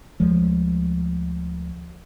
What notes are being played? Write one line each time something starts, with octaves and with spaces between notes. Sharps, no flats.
D2 F3 G#3